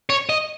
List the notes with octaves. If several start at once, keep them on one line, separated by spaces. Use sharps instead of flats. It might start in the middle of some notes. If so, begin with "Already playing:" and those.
C#5
D#5